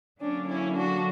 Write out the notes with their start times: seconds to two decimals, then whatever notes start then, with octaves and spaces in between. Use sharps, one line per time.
0.20 D3 F#3 A#3 C#4 D4
0.48 C#4 E4
0.76 D4 F#4